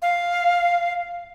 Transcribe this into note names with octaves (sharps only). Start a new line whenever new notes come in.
F5